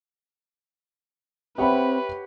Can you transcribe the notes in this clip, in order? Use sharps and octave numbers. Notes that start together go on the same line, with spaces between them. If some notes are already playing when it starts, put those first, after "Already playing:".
C4 G4 B4 C#5 E5 F#5 G5 B5